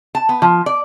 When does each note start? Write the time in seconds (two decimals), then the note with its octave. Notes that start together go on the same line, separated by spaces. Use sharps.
0.15 A5
0.29 B3
0.42 F3
0.66 D5